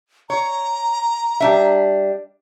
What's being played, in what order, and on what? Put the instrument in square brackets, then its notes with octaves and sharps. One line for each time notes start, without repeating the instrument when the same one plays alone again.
[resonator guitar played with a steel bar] C#5 [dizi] A#5
[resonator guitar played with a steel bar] G3 D4 E5